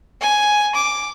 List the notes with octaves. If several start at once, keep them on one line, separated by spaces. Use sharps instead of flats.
G#5
D6